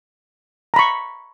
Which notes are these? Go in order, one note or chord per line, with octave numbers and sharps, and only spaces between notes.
A#5 B5 C#6